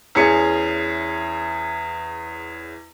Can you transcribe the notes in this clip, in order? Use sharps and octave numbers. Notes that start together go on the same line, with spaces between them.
E2 C#4 G#4 C#7